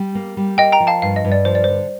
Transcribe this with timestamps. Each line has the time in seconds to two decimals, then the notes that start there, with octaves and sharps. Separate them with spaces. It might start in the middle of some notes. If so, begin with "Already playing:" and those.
Already playing: G3
0.15 A#3
0.37 G3
0.58 A#3 D#5 G5
0.72 G5 A#5
0.80 F3
0.87 F5 A5
1.02 G2 F5
1.16 D#5
1.25 G2
1.32 D5
1.45 F3 C5
1.55 D5
1.64 C5
1.68 D3